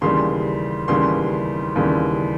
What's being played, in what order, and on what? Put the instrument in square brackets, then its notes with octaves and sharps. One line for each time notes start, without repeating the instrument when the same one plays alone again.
[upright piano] D#2 C#3 E3 G3 C6
D#2 C#3 E3 G3 C6
D#2 C#3 E3 G3